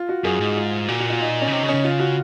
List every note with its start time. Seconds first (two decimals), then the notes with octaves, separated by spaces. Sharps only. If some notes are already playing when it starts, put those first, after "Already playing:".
Already playing: F4
0.09 F#4
0.24 F#2 G#4
0.40 G#2 D#4
0.57 F4
0.88 A#2 F#4
1.00 F#4
1.10 F4
1.20 D#4
1.41 C#4
1.47 C#3
1.52 C3 D#4
1.63 C#3
1.68 C#4
1.74 C#3
1.84 F4
2.00 F#4